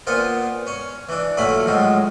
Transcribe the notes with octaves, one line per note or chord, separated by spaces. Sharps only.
A#2 B3 F4 C5
C#4 C#6
E3 D4
A#2 F#3 A3 C#4 B5
A2 F3 F#3 G#3